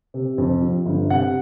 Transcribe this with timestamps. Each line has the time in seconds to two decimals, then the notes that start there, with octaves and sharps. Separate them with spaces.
0.14 C3
0.38 F2
0.62 F3
0.86 G1
1.10 C3 F#5